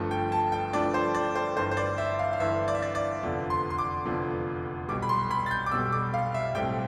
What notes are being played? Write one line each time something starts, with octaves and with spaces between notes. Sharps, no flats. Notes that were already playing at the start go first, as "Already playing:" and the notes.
Already playing: G1 G2 F3 A3 D4
G5
A5
G5
G1 G2 F3 A3 D4 D5
C5
D5
C5
G1 G2 E3 C5
C5
D5
E5
F5
F5
G1 G2 E3 E5
D5
E5
D5
D5
F1 E2 D3 F3
C6
C6
D6
F1 E2 D3 F3
B1 B2 G3 D6
B5
C6
B5
A6
G6
D6
B1 B2 G3 E6
D6
F5
E5
B1 A2 G3 C4 G5